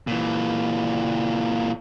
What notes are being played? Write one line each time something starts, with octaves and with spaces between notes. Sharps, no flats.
A#2 E3